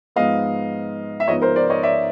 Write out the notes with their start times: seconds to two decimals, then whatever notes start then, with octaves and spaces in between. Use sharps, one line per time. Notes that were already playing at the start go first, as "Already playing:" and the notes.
0.16 G#2 F3 G#3 B3 D#5 F5
1.20 E5
1.27 G#2 F3 G#3 B3 C#5 D#5
1.42 A#4 C5
1.56 C5 D5
1.70 C#5 D#5
1.83 D5 E5